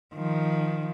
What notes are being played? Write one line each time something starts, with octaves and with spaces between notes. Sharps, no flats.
D#3 F3